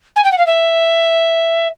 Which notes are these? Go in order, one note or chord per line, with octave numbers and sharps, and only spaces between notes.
G#5
G5
F#5
F5
E5